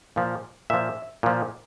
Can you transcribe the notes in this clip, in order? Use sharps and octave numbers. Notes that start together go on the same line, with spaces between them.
A#2 F3
A#2 F3 E5
A#2 F3